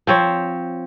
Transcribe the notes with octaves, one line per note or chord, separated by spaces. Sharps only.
F3 C4 C#5